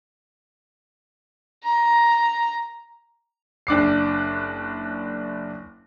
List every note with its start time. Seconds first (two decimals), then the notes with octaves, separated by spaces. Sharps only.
1.64 A#5
3.67 F#1 D4 D6 C7